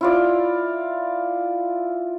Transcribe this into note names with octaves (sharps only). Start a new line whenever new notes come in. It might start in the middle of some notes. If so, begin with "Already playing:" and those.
E4 F4 D5